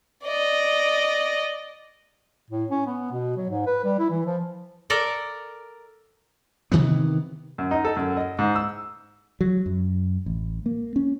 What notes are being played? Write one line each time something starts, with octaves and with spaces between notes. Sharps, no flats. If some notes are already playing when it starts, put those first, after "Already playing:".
D5 D#5
A2
C#4
B3
B2
F#3
G#2
B4
G3
E4
E3
F3
A4 A#4 D5
C3 D#3 E3 B3
F#2
D#4
A4
F#2
D#5
G#2
E6
F#3
F#2
A1
A#3
C#4